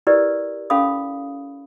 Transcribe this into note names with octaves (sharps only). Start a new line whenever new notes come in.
E4 G4 A#4 B4 D5
C#4 A4 F5 B5 D#6